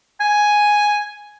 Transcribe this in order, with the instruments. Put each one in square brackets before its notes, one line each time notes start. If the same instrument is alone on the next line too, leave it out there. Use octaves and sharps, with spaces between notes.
[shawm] G#5